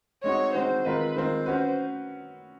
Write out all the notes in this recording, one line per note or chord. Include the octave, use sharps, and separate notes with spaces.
G#3 C4 D#4 F#4 C#5
G#3 C4 D#4 F#4 C5
D#3 G#3 C4 F4 A#4 B4
D#3 G#3 C4 F4 A#4 C5
C#4 F#4 B4